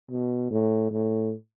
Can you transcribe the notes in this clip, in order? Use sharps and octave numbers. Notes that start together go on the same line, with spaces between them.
B2
A2
A2